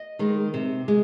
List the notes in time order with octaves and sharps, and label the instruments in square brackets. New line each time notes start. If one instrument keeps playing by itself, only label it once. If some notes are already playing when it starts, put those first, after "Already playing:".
Already playing: [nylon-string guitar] D#5
D#3 G#3
C3
G#3